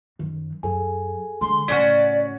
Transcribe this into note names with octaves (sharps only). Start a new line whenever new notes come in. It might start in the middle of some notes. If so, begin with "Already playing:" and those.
F#2 D#3
F#2 G#4 A4 G#5
D3 G#3 C6
A2 C#3 C#4 D4 F#4 D5 B6